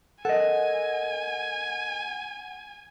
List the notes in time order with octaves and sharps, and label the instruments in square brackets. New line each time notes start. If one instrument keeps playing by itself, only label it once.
[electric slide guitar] A4 A#4 D#5 [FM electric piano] F#5 [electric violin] G#5